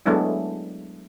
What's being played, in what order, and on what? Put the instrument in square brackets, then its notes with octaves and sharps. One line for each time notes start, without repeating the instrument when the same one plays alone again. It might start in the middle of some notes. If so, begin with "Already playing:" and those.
[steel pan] F#3 G#3 A3 B3 D4 E4